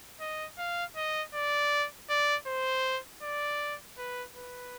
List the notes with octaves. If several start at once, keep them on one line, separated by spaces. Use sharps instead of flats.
D#5
F5
D#5
D5
D5
C5
D5
B4
B4